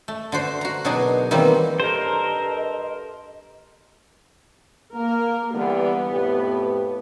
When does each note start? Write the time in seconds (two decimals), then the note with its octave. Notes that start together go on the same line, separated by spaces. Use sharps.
0.08 A3
0.32 D3 F#4 C5
0.61 F#4 A#5
0.84 B2 F#3 D4 D#4 G#4 A#4
1.31 D#3 E3 F#3 G3 A#3 C4
1.80 G2 A4 A#4 C5 D#5
4.95 A#3 A#4
5.54 D3 E3 G3 B3
6.11 F2 A2 G4